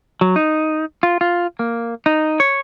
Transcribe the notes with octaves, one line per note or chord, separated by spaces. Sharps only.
F#3
D#4
F4
F4
A#3
D#4
C#5